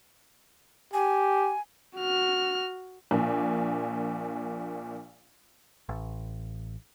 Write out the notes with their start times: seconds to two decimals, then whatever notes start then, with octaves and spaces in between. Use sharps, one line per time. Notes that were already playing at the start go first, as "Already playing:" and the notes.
0.93 G4 G#5
1.97 F#4 F6
3.11 A#1 A#2
5.89 A1